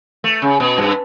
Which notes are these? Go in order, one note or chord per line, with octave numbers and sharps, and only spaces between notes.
A3
C#3
B2
G2